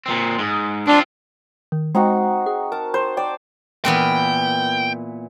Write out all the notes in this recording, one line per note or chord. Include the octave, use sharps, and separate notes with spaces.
A#2 C4
G#2
C4 D4 F4
D#3
G#3 C4 D#4 F#4
G#4
A#4 A5
C5
D5 G5
A#2 E3 B3 G5